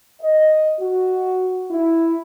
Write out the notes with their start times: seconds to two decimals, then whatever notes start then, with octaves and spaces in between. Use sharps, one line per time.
0.22 D#5
0.80 F#4
1.70 E4